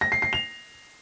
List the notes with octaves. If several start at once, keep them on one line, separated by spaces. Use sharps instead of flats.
A#6
C7
C7
F7